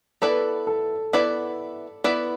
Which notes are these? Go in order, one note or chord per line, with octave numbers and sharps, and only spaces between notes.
B3 E4 A4 B4 D5
A4
B3 E4 B4 D5
B3 E4 B4 D5